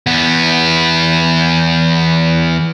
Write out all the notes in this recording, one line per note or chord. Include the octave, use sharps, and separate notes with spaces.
E2 B3